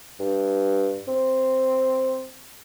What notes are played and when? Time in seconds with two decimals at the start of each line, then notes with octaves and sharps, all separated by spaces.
0.20 G2
1.08 C4